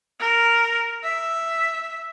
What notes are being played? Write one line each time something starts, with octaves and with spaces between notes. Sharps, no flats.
A#4
E5